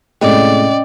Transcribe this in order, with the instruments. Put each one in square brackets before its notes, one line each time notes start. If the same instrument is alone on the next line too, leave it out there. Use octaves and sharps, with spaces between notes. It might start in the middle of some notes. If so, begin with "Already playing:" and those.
[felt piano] A2 C3 G#3 [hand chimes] C#4 D#5 G5 [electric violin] D5